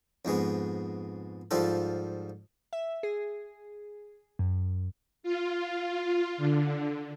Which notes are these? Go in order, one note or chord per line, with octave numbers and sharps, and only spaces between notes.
F2 G#2 G#3 B3
G#2 F3 G3 F4 A4
E5
G#4
F#2
F4
D3